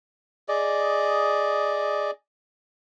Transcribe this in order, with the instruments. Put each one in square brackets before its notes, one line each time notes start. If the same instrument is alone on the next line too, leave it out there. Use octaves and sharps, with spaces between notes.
[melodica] G#4 D5 D#5